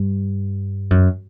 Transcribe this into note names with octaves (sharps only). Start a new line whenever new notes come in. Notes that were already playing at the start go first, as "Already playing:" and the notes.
Already playing: G2
F#2